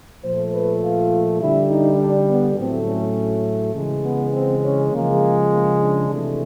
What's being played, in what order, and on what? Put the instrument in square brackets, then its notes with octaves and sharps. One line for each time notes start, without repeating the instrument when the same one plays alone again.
[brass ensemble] A#2 F3 A3 C5
B4
F4
D3 G3 E4
D#4
D4
B3
A2 F#3 A3 C4
C#4
C#3 E3 G#3
B3
C4
C#4
C#3 F3 G#3 A#3
A#3
D4
C3 E3 A3